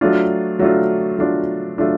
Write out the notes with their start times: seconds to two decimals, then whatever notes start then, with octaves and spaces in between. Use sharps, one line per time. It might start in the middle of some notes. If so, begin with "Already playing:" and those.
0.01 F#3 A3 D4 F4
0.59 F#3 A3 D4 F4
1.19 F#3 A3 D4 F4
1.78 F#3 A3 D4 F4